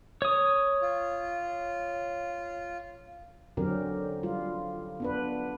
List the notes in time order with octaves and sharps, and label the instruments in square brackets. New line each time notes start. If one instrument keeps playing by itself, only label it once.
[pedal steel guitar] C#5 D#6
[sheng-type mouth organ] F4
[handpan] D3 F#3 C4 C#4 G4 A#4
G3 F4
B3 D4 B4